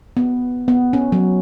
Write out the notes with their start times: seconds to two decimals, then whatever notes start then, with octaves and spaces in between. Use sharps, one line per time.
0.17 B3
0.68 B3
0.93 C#4
1.12 F#3